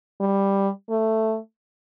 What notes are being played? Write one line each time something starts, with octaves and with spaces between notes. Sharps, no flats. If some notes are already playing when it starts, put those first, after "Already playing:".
G3
A3